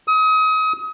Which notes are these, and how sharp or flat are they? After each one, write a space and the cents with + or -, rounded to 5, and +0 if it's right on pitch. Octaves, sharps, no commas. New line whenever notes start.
D#6 +35